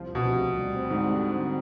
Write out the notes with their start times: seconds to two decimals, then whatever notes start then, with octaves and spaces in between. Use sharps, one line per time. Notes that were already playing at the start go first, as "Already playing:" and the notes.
Already playing: C2 F3
0.09 D2
0.15 B2
0.25 C3
0.42 D2
0.57 G3
0.75 C4
0.90 G#2 D3
1.06 D3